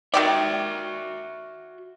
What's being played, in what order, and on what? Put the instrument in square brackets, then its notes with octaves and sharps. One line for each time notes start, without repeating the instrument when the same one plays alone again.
[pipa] D#3 G4 D5 [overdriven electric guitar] F#4 E5